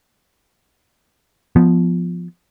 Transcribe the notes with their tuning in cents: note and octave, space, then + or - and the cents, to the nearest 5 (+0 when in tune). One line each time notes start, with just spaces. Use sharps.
F3 +0 B3 +0